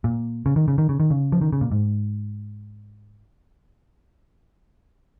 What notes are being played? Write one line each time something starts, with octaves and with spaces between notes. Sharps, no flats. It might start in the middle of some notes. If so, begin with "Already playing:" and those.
A#2
C#3
D#3
C#3
D#3
C#3
D#3
C#3
F3
D#3
C#3
A#2
G#2